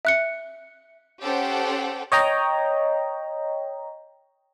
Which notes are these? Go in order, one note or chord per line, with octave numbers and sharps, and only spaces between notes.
E5 F#6 C#7
C#4 G4 A4 C5 F#5 G5
C#5 D#5 G5 A#5